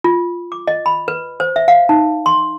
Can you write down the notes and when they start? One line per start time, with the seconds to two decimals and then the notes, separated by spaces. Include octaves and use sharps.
0.04 F4
0.52 D6
0.68 D#5
0.86 B5
1.08 B4
1.40 C5
1.56 E5
1.68 F5
1.89 D#4
2.26 C6